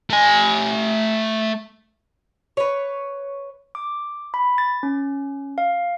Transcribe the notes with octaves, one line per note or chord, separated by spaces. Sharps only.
A3 G#5
B4 C#5
D6
B5
A6
C#4
F5